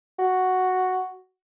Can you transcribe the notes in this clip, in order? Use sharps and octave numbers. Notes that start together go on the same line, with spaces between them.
F#4